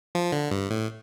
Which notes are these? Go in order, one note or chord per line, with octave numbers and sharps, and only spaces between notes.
F3
D3
G2
A2